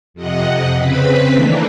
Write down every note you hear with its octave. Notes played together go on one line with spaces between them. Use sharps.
F2 C3 D#5 F#5
C#3 C4 B4 B5
D#3 E3 A3 A#3 D4